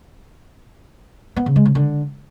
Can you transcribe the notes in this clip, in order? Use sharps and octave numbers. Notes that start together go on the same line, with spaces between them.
B3
C#3
G#3
C#3
D3